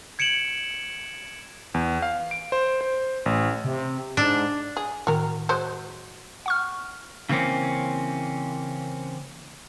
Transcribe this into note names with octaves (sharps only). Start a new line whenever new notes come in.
G#6 C#7 D7 E7 F#7
E2
F5
D7
C5
C5
A1
C3
G#2 D4
G#4
A2 D#3 F#4 A#4
F#3 G#3 C5
F#5 C#6 F6
C#3 E3 A#3 C4 C#4